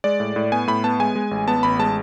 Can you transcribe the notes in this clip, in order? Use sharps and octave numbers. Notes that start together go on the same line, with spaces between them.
G#3 D5
A2
A2
B3 G#5
A2 B5
B3 A5
G#3 G#5
G#3
A1
B3 A5
A1 B5
G#3 A5